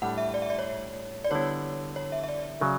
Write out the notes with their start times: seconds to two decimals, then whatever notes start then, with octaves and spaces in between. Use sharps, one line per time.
0.02 A2 G3 D4 A4 F#5
0.18 E5
0.34 D5
0.42 E5
0.50 D5
0.59 C#5
1.24 D5
1.31 D3 G3 B3 E4 C#5
1.96 C#5
2.12 E5
2.23 E5
2.28 D5
2.61 C#3 F#3